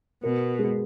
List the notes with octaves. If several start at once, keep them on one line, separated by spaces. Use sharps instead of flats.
B2 A#4
G#3